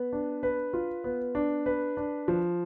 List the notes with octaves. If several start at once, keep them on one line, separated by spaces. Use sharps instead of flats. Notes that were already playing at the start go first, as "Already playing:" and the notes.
Already playing: B3
D4
B4
F4
B3
D4
B4
D4
F3